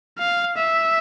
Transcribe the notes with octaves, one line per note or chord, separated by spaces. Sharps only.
F5
E5